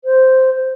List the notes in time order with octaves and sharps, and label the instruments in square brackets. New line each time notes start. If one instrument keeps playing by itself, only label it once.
[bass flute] C5